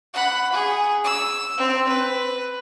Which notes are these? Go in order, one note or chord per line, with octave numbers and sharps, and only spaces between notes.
F#5 B5
G#4
E6
C4
B4